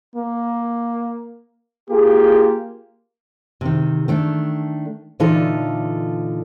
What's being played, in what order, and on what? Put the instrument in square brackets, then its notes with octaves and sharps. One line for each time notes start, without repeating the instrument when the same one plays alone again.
[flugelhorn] A#3
[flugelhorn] A#3 [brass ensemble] F4 G4 G#4
[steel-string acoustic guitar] C3 D#3
D#3 A3 D4
A#2 D3 E3 D#4 F4 A4